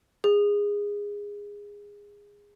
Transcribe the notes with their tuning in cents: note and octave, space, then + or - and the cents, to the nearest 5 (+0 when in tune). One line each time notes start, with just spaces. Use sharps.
G#4 -20